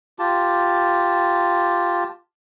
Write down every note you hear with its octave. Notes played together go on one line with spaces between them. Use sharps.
F4 G4 A5